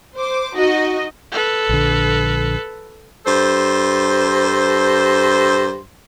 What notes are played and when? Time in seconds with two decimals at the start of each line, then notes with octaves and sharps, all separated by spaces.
0.17 C5 D6
0.53 D#4 F#4 D#5
1.32 A4 B4
1.69 A#1 D3
3.26 G2 A4 C5